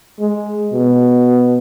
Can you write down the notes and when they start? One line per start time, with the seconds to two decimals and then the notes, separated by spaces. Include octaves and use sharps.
0.20 G#3
0.73 B2